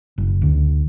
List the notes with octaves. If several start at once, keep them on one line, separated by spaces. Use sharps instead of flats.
F#1
D2